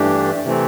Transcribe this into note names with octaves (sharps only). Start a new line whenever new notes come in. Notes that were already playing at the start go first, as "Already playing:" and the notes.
Already playing: G2 E3 A3 D4 G4
C3 E3 A3 C4